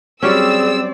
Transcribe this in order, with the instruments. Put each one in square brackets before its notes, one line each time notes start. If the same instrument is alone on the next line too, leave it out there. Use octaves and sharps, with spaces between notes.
[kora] F#3 G3 C#4 [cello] C4 D5 [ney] G#4 [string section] E6